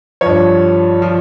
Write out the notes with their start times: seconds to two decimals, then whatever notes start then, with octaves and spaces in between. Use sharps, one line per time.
0.21 G2 F3 C#5
1.02 F3